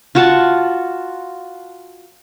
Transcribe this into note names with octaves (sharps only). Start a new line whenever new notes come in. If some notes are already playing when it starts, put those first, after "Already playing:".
F4 F#4 F#5 A5